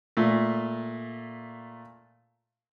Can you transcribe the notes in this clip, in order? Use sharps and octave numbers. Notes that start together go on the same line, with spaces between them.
A#2 A3